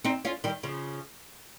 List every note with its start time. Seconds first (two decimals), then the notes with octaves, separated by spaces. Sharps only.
0.04 C4 D#4
0.25 C#4 F4
0.44 D#3 G3
0.63 C#3 F3